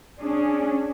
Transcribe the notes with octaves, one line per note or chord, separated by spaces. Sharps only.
C#4 D4 G#4